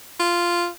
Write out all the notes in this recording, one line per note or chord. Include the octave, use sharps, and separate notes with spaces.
F4